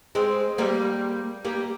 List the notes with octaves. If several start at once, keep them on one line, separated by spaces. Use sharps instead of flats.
G#3 C4
G3 A#3
G3 A#3